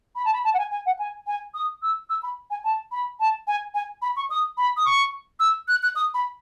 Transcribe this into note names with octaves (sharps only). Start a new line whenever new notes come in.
B5
A5
B5
A5
F#5
G#5
G#5
F#5
G#5
G#5
D#6
E6
E6
B5
G#5
A5
B5
A5
G#5
G#5
B5
C#6
D#6
B5
D#6
C#6
E6
F#6
F#6
D#6
B5